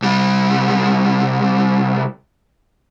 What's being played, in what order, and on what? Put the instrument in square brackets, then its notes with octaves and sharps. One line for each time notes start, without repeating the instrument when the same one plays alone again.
[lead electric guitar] C2 G3